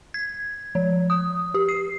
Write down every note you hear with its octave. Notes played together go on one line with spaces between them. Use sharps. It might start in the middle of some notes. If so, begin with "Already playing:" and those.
G#6
F3
D#6
G4
C7